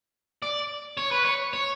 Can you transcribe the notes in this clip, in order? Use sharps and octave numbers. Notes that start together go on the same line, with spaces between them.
D5
C#5
B4
C#5
C#5